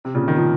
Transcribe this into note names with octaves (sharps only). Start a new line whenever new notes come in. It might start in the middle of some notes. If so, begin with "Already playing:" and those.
C3
A#2 C#3
D#3
C#3 F3